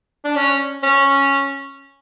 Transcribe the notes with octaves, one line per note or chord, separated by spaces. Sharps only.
D4
C#4
C#4